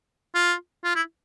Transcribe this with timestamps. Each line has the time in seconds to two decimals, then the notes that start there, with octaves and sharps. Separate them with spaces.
0.35 F4
0.84 F4
0.96 E4